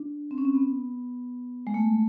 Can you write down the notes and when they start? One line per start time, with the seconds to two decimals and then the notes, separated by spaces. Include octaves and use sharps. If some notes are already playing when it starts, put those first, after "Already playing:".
Already playing: D4
0.31 C4
0.38 C#4
0.45 C4
0.54 B3
1.67 G#3
1.74 A3